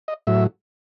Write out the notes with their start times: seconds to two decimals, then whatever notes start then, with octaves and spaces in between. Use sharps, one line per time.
0.08 D#5
0.27 A2 F#3 E5